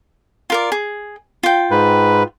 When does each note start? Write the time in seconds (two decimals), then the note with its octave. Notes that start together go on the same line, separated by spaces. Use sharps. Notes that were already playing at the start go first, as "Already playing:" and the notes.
0.50 F4 A#4 D5
0.72 G#4
1.43 F4 G5
1.71 G#2 B4